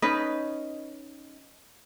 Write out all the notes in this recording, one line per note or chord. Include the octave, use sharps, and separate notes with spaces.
C#4 D#4 B4 D#5